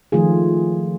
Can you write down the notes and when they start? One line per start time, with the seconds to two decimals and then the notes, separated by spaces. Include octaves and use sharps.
0.12 D#3 F3 A3 F4 G#4